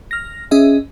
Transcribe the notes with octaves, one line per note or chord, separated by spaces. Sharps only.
F6 A#6
C#4 G#4 D#5 E5